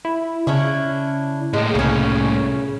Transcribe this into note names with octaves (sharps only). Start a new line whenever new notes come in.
E4
C#3 C#4 D4 E4
A2 G#3 A#3
C2 C#3 C#4